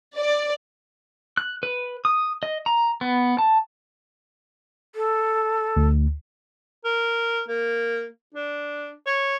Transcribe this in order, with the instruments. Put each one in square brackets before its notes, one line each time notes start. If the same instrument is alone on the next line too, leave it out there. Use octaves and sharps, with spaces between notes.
[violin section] D5
[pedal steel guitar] F#6
B4
D#6
D#5
A#5
B3
A5
[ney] A4
[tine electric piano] D2
[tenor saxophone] A#4
A#3
D4
C#5